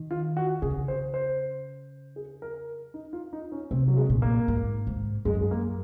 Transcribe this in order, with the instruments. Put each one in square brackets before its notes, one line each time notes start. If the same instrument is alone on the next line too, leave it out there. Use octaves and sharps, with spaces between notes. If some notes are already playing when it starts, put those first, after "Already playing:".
Already playing: [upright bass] D#3
[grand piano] F4
F#4
[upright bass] C#3 [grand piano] G#4
[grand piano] C5
C5
G#4
A#4
D#4
F4
D#4
C#4
[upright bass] C3 [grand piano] C4
[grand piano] F#3
G#3
[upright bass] A#2
[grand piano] A#3
[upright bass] G#2
G#2
[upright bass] F#2 [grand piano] G#3
[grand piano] G#3
A#3